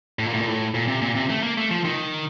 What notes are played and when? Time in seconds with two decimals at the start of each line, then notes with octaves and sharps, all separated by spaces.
0.19 A2
0.26 A#2
0.33 A2
0.40 A#2
0.48 A2
0.75 A#2
0.88 C3
1.02 A#2
1.15 C3
1.30 A3
1.43 A#3
1.57 A3
1.71 F3
1.85 D#3